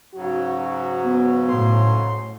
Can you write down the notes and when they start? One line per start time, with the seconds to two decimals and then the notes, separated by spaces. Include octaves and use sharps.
0.15 G#2 C#3 F#3 F#4
1.03 B3
1.49 A2 C6